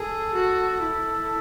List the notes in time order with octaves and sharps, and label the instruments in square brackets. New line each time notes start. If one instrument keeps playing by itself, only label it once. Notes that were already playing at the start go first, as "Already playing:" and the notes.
Already playing: [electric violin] G#4 [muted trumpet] A4
[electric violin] F#4
E4